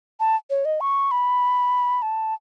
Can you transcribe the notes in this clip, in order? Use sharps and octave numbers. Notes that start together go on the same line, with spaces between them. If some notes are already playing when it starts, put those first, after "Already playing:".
A5
C#5
D#5
C#6
B5
A5